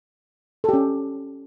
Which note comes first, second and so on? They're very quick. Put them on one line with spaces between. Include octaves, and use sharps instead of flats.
A4 G4 C#4